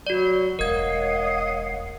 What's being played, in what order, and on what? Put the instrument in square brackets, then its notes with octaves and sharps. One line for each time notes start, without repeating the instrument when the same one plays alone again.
[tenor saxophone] F#3 [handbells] F#4 D5
[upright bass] E1 G#3 [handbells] A#4 G#6 [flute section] C#5 F5 F#5 [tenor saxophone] D#5